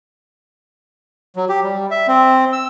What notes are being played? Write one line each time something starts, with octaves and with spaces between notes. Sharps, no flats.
F#3
G4
G3
E5
C4
E6